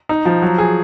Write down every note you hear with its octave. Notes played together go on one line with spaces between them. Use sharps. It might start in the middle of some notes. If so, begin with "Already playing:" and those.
D#4
F3
F#3
G#4